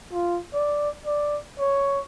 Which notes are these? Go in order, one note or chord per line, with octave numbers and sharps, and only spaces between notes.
F4
D5
D5
C#5